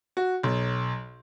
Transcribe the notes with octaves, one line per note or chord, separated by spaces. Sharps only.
F#4
B1